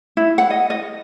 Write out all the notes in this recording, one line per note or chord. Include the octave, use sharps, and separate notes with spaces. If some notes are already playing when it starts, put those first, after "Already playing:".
E4
F#5
D#5
D#5